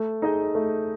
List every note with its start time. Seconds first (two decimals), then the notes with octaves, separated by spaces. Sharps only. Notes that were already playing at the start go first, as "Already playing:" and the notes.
Already playing: A3
0.22 D#4 G#4 D#5
0.55 A3